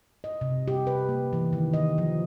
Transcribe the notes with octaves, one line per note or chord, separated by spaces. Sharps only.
D#5
C3
G4
B4
A#3
E3
D#3
D#5
F3